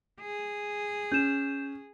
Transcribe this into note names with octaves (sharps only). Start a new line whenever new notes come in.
G#4
C#4 G6 E7